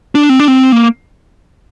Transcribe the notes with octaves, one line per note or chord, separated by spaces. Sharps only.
D4
C4
D4
C4
A#3